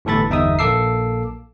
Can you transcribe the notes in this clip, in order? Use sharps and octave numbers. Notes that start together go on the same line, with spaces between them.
G1 A2 E3 A4 B5 A6
G1 E2 D#4 E5 D#6
A#1 A#3 A4 D6 E6 C7